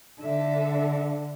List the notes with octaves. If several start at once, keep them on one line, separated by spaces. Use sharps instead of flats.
D3 D4 A4 E5